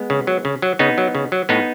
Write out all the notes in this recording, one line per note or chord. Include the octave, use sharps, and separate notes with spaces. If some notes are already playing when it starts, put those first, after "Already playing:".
Already playing: G#3 B3
C#3
F#3
C#3
F#3
C#3 B3 D#4
F#3
C#3
F#3
A2 B3 D#4